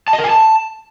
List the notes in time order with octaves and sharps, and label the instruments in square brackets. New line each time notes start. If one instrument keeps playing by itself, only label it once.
[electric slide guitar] A5
D#5
A#4
G#5
A5